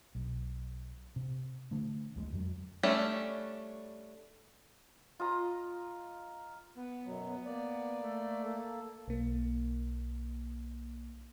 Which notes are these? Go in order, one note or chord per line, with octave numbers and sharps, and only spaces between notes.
B1
C3
D3 A3
D2 G3 G#3
F2 F#3
G3 A3 C#4 D4
F4 D#5 A#5
B3
F#2 B2 F#3
B3
A#3 D5
A3
A#3 A4
B1 A#3